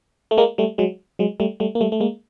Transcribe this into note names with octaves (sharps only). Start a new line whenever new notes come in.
A3
G#3 A#3
G3 A3
F#3 G#3
F#3 G#3
G3 A3
G3 A3
A#3
G3 A3
A3
G#3 A#3